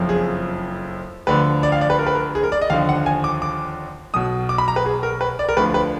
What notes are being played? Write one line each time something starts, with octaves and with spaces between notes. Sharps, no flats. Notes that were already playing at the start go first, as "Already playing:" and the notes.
Already playing: F#1 F2 F3
G#4
D2 D3 F3 B4
D5
F5
D5
B4
A#4
B4
A#4
G#4
A#4
D5
D#5
D#2 D3 F3 F5
F#5
G#5
D6
D6
B1 B2 D#6
D6
B5
A#5
B4
G#4
A#4
B4
D5
A#4
D2 D3 F3 B4
B4